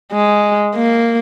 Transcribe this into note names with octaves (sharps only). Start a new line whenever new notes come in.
G#3
A#3